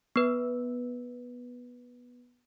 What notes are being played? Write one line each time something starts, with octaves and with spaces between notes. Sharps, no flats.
B3 B4